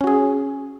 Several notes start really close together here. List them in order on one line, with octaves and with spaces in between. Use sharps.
C#4 F#4 G#4